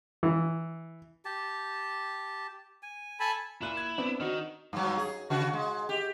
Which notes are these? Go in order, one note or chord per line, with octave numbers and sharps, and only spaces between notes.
E3
G4 A5
G#5
A4 G#5 A5 B5
A#2 E4 F#6 D#7
G#6
B3 C4 D4
D#3 D#4 F#4
G2 F#3
G#4
C#3 F#4
G#3
G4